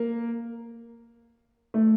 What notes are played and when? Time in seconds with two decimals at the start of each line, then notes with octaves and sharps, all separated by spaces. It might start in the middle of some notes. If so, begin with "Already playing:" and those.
Already playing: A#3
1.74 A3